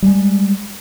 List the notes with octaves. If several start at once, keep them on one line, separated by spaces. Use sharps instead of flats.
G3 G#3